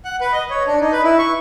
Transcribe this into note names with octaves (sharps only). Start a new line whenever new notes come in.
F#5
B4
D#5
C#5
D4
D#4
B4
E4
C#6